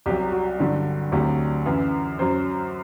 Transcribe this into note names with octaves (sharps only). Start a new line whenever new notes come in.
C2 C3 F#3 G4
F#4
G2 D3 F#3
D2 C3 F#3 G4
F#2 E3
F#2 F#3 C5